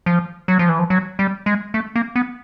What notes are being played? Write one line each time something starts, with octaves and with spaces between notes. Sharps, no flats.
F3
F#3
F3
E3
F3
F#3
G3
G#3
A3
A#3
B3